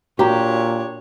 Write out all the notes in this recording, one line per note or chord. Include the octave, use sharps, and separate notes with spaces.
A#2 D4 F#4 G4 C#5 F5 A#5